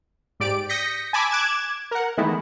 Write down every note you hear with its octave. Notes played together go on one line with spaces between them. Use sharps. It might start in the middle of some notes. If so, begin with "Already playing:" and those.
G#2 G4 D5 D7
D#6 G6 A#6 B6 C#7
G#5 A5 B5 D6 E6
D6 F#6 G#6 E7
A#4 F#5
D#3 E3 G#3 A3 B3 E4